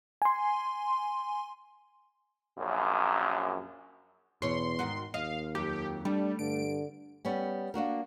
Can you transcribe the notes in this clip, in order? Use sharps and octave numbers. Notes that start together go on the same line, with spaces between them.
G#5 C6
A#1 F#2
E2 B2 C#5 C6
G#2 D#3 F#4
D#2 D#5 F5
F2 F#3 G4
G3 A3 D4
G2 D3 D7
G3 B3 C#4
A#3 D4 F#4 A#4